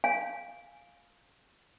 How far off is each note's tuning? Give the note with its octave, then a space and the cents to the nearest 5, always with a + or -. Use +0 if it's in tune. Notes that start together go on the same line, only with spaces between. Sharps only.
F5 +5 G#5 +0